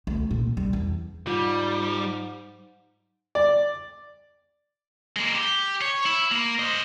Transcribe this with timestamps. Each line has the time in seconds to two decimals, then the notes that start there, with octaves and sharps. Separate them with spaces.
0.07 D2
0.31 A#2
0.57 G3
0.73 E2
1.27 G#2 G3 F4
3.35 D5
5.16 G#3 A#3
5.35 G4
5.82 C#5
6.06 E4
6.31 A#3
6.59 C5 D#5